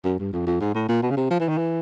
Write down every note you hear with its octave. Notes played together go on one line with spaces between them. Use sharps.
F#2
G2
F2
F2
G#2
A2
A#2
B2
C#3
C3
F3
E3
D#3
E3